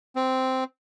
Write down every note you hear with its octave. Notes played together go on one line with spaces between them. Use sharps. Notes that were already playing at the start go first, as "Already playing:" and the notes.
C4